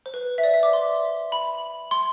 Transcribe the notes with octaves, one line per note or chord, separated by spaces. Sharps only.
C5
B4
E5
D5
E5
D6
C6
B5
C6